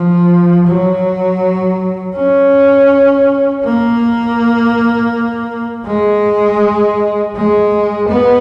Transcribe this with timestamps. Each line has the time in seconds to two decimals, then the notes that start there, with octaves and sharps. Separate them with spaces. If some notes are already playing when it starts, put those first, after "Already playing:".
Already playing: F3
0.67 F#3
2.15 C#4
3.64 A#3
5.86 G#3
7.35 G#3
8.09 B3